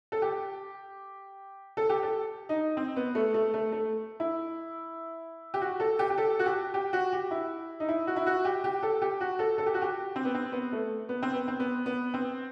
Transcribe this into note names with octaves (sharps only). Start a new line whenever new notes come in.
A4
G4
A4
G4
A4
D#4
C4
B3
A3
A3
A3
A3
E4
G4
F#4
A4
G4
G4
A4
F#4
G4
G4
F#4
G4
E4
D#4
E4
F#4
E4
F#4
G4
G4
A4
G4
F#4
A4
A4
G4
F#4
G4
C4
B3
C4
B3
A3
B3
C4
B3
C4
B3
B3
C4